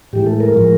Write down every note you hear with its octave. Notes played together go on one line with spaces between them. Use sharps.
A2 E3 G#3 G4
A4
A#4
A2 F3 G#3